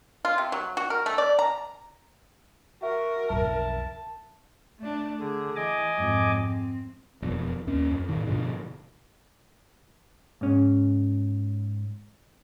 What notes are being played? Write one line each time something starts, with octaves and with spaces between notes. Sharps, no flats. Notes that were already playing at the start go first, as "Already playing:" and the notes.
F4
C3
F#3
F#4
A#4
A3
D5
A#5
F#4 A#4 E5
B1 F2 A5
A3 D4
D3 G#4
E3 D#5 G#5 D6
F2 G#2
C4
E1 F2
D#2 C#4
F2
A2 D#3
G2 B2 D3 F3
G#2 C#4